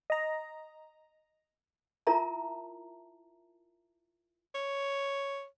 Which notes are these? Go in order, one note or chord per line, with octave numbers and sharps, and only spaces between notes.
D#5 A#5
E4 F4 A#4 E5 A5 A#5
C#5